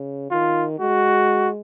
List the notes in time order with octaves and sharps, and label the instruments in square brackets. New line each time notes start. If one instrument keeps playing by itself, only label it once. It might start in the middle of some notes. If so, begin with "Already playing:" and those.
Already playing: [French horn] C#3
[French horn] D#3 [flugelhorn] F4
[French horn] G#3 [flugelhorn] F#4